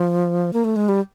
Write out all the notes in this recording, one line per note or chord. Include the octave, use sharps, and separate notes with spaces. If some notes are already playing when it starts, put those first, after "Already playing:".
Already playing: F3
A#3
A3
G#3
G3